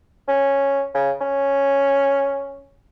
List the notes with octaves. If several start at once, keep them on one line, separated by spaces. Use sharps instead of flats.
C#4
C#3
C#4